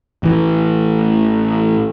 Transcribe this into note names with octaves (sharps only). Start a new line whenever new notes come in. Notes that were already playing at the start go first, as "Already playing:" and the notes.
A1 E3